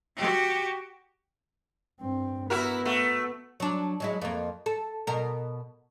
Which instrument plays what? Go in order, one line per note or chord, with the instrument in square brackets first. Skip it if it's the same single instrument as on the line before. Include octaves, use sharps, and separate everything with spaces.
[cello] F#4 G4
[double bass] G2 C4
[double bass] B3 [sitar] E4 F#4 A#4
[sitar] A3 F#4
[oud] F#3 D4
F#3 G#3 E4
F2 A#3
A4
B2 A#4